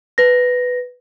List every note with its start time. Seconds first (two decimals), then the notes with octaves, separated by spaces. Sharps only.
0.18 B4 A#6